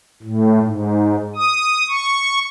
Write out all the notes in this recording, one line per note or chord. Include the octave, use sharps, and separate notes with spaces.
A2
G#2
D#6
C#6